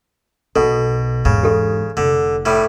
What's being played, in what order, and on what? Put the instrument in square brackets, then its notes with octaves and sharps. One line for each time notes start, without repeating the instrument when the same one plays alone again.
[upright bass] B1 [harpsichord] B2 [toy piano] A4
[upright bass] E2 G#2 [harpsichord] C#3
[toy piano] G4 A4
[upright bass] F1 [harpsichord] D3
[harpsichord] A2 G3